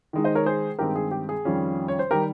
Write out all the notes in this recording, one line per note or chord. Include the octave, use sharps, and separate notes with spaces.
D#3 G#3 D#4
C5 D#5
A#4 C#5
G#4 C5
G2 D#3 G#3 C4 G4 A#4
G#4
G4
G#4
F2 D#3 G3 C#4 F4
C#5
C5
D#3 G3 G4 A#4